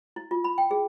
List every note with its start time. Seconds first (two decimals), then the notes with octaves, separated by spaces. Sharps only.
0.16 E4
0.31 F4
0.44 B5
0.58 G5
0.71 G#4